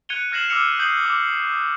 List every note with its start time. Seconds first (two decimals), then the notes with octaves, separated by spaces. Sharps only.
0.09 F#6 G#6 C#7 D#7 F7 G7
0.32 F6 G#6 A#6 C7 E7 F#7
0.49 D6 E6 F6 C#7 F7
0.79 D#6 G6 C7 F#7
1.05 D6